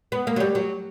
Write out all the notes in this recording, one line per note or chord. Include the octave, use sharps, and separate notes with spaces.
B3
A#3
F#3
G3
F#3